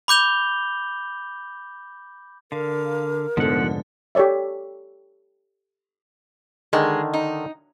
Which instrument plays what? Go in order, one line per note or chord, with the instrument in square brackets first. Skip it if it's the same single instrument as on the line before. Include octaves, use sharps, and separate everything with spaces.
[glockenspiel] B5 D6 G6 F7 G7
[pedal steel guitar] D3 [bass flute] A#4 [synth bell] F5
[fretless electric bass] F1 G#2 D3 [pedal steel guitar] F3 F#5 [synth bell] B3 A4
[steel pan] G4 A4 C#5 D5 E5
[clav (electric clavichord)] D3 D#3 [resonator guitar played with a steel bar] G#3
[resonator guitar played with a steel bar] D#4